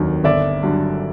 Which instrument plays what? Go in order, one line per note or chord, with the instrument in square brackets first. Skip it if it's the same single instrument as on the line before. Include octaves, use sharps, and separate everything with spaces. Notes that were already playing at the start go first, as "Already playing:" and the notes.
Already playing: [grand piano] F1 D#2 D#3 F#3
G1 D5 E5
G2 D3 F#3